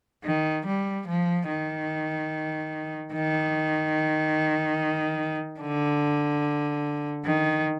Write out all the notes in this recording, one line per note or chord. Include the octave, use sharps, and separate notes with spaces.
D#3
G3
F3
D#3
D#3
D3
D#3